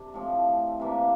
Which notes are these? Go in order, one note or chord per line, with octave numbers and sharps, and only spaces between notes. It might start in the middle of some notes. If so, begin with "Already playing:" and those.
Already playing: C3 D4
A2 F3 C4
C3 E3 A#3 D4